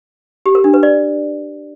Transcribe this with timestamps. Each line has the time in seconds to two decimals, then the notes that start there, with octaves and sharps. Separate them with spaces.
0.46 G4
0.55 A#4
0.64 D4
0.74 B4
0.83 D5